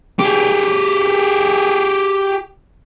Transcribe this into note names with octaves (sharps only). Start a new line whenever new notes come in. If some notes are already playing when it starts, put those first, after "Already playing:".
G4 G#4